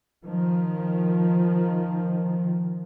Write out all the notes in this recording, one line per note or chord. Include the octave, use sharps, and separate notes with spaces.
D#3 F3